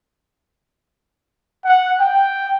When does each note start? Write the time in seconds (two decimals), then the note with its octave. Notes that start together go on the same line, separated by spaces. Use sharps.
1.65 F#5
2.00 G5